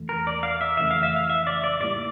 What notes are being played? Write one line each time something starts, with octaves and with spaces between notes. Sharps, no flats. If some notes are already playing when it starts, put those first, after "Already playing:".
Already playing: E2 E3 A3
A#4
D5
F5
E5
F2 C#3 E3 A3 E5
F5
E5
F5
E5
D5
D5
A2 G3 A#3 E4 D5